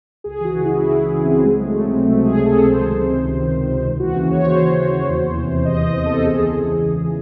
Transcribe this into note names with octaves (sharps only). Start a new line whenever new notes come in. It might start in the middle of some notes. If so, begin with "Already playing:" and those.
C#2 G#4
E3 F#4
C#3
C#2 E4
C#2 E4
E3
C#3
C#2 C4
C#2 G#3
F#3
A3
C3
C4
C#2
C#2 A3
F#3 G#4
C3
A4
C#2
C#2 C5
D#3
C3
C#2
C#2
D#3
C3
C#2
D#2
E3 F#4
C#3
D#2 C#5
D#2 C5
E3
C#3
D#2
E2
E3
C3
E2
E2 D#5
E3
D#5
C3
A4
E2
C#2 G#4
E3
C#3
C#2
C#2
E3